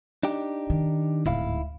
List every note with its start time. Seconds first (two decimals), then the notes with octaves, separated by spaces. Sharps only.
0.23 D4 D#4 G4
0.70 D#3
1.26 D1 G#2 E4 F5